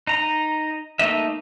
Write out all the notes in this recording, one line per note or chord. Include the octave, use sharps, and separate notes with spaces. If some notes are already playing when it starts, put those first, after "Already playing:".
D#4 A#5
A3 A#3 D#4 D#5 E5